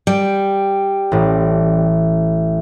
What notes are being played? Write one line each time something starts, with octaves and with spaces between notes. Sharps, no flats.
G3 G5
A1 A2